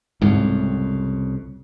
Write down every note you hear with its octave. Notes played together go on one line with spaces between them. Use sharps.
C2 F2 G#2 C#3